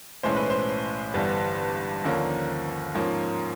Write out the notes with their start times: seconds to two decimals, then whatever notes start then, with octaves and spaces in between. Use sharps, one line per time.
0.23 B1 A2 E3 G#3 C#4 C5
0.36 B4
0.50 C5
1.14 G1 G2 E3 G3 B3
2.04 D#2 D3 F3 A#3 C#4
2.95 G#2 F3 A#3 C#4